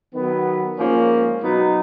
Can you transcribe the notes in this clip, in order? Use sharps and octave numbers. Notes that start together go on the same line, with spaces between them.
D#3 F#3 B3
G#2 F3 A#3 C#4
B2 F#3 B3 D#4